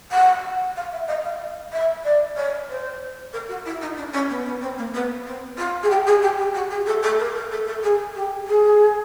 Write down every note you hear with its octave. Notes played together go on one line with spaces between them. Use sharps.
F#5
F5
E5
D#5
F5
E5
D5
C#5
C5
A#4
F#4
E4
D#4
D4
C#4
B3
B3
C4
A#3
B3
C4
F4
G#4
G4
G#4
G4
G4
F#4
G#4
A4
A4
A#4
A#4
A4
A4
G#4
G4
G#4